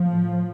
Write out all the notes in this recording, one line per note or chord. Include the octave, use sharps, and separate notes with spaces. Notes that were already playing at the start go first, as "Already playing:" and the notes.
Already playing: F3
A2